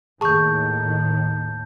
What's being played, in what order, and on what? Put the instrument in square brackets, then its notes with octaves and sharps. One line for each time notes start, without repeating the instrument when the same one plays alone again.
[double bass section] D#2 A2 D#3 [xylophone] G#4 C#6 [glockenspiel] A5 G6